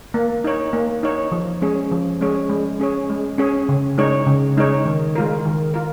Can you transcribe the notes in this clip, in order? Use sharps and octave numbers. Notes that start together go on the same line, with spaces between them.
A#3
D#4 C#5
A#3
D#4 C#5
F3
G#3 C#4 G#4 C#5
F3
G#3 C#4 G#4 C#5
G#3
C#4 G#4 C#5
G#3
C#4 G#4 C#5
C#3
G#3 D#4 C#5
C#3
G#3 D#4 C#5
D#3
G#3 F4 A#4
D#3
F4 A#4